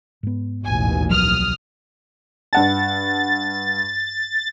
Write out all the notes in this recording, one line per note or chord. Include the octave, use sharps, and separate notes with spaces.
G#2 B3
A1 D#2 B2 G#5
C2 F3 F#3 D#6 F6
G2 F#5 A5 A6